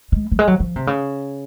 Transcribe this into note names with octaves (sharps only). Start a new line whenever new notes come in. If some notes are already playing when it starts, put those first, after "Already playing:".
G#3
F#3
G#3
F#3
F3
C3
C#3